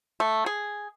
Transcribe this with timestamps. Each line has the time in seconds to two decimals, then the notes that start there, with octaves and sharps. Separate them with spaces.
0.20 A3
0.46 G#4